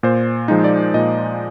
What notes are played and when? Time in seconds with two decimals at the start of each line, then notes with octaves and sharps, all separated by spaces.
0.03 A#2 C5
0.48 F3 G#3 D#4
0.64 D5
0.94 A#2 D#5